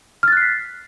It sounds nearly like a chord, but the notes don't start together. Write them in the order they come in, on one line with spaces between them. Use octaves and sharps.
F6 A6 F#6 C7 B6